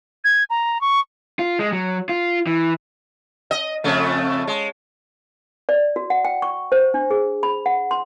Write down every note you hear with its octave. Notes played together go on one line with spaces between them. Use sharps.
G#6
A#5
C#6
F4
G#3
F#3
F4
E3
D#5
F2 C#3 A3
G#3
D5
F#4
F#5
G5
C#6
C5
D4
G#4
B5
F#5
C6